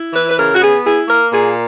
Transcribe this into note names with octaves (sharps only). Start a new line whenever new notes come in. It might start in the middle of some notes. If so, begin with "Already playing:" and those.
Already playing: E4
E3 B4
B4
C#3 A#4
F#4
B3 G#4
E4 G#4
A#3 A#4
A#2 G#4